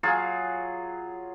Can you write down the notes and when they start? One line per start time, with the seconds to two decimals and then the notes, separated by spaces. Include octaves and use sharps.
0.03 F#3 F4 G#4